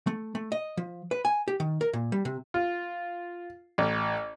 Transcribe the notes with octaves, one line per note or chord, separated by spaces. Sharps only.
A3
A3
D#5
F3
B4
G#5
G4
D#3
A#4
A#2
G3
C3
F4
A1